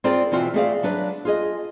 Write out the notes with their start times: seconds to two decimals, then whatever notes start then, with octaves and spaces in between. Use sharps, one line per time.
0.04 C4 F4 G#4 A#4 C5 D5
0.31 B2 E3 C4 F4 F#4
0.54 A3 C4 G#4 B4 D5 F5
0.83 F#3 D4 B4
1.25 F4 G#4 D#5